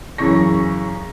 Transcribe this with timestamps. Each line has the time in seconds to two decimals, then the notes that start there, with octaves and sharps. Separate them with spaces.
0.18 F#2 C#3 E3 C#6 A#6